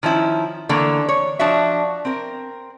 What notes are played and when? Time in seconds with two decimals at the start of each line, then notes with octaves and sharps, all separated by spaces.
0.03 D#3 F3 C#4 E4
0.69 D3 E3 A3 A#3
1.09 C#5
1.39 F3 D4 F#4 E5
2.05 C4 A#4